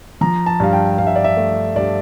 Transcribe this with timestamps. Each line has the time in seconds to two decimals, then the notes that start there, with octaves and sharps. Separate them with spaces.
0.21 F3 A#5
0.46 A5
0.60 G2 F5
0.73 G5
0.98 G2 F5
1.07 E5
1.16 D5
1.24 E5
1.37 A3
1.76 G2 D5